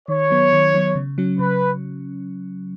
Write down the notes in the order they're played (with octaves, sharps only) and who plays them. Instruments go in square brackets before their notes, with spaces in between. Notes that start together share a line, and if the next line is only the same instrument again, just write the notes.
[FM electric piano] D#3 [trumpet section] C#5
[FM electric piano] F#3 B3
D#3
F#3 B3
C#3
F#3 C#4
[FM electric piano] C#3 [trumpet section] B4